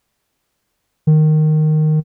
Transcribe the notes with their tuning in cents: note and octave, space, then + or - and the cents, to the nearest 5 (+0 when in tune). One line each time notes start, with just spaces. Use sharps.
D#3 -10